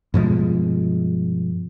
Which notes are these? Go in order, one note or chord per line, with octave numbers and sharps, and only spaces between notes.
G2 B2 F3 G#3